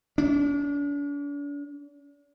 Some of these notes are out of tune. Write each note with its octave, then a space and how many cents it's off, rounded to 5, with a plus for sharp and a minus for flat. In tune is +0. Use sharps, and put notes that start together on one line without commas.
D4 -40